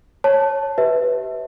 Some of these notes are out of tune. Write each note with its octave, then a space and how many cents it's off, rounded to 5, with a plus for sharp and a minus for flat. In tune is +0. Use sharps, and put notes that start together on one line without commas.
C#5 -15 A5 +0
G4 -30 B4 +0 E5 -25